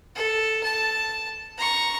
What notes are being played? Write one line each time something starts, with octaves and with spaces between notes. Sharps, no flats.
A4
A5
A#5 C#6